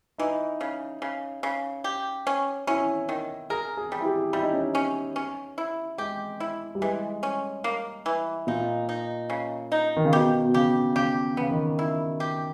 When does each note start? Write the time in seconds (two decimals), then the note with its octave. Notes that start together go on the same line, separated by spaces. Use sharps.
0.18 E3 D#4
0.61 C#3
1.02 C#3
1.43 C#3
1.84 G4
2.27 C#4
2.67 C#4 E4
3.09 D#3
3.50 G#4 A#4
3.77 G#4
3.92 G3
4.01 E4
4.05 G4
4.33 G3 E4
4.42 D#4
4.52 C#4
4.61 D#4
4.75 C#4
5.16 C#4
5.58 E4
5.98 G#3 G4
6.40 E4
6.75 G3
6.82 E3 G#3
7.23 C#4
7.64 A#3
8.06 E3
8.47 A#2 D#4
8.89 D#4
9.30 C#3
9.72 D#4
9.96 D#3
10.05 C#3
10.12 B2 G4
10.44 B2
10.54 C#3 G4
10.96 C#3 G4
11.37 C#3 B3
11.51 D#3
11.79 E4
12.20 G4